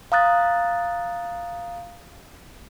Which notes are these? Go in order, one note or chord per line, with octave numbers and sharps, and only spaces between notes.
F5 A#5 D#6 F#6 A6